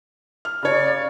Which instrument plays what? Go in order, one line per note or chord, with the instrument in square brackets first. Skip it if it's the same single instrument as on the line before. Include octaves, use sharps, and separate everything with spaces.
[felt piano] F6
[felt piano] C#3 C#5 [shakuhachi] D5